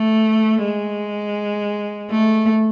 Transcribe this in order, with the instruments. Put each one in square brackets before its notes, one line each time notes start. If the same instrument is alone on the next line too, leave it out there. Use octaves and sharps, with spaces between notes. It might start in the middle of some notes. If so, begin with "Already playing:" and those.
Already playing: [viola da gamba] A3
G#3
A3